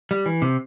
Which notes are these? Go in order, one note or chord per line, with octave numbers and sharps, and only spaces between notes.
G3
E3
C3